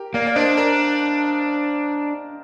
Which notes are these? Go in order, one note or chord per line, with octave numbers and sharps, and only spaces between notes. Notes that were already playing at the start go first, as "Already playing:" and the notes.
Already playing: G4 A#4
A#3 D5 F5
D5
D4 C5 D#5
A#4 D5